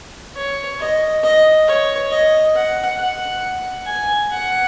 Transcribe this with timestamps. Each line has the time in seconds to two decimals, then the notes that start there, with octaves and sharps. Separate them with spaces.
0.35 C#5
0.79 D#5
1.23 D#5
1.67 C#5
2.11 D#5
2.55 F#5
2.99 F#5
3.87 G#5
4.31 F#5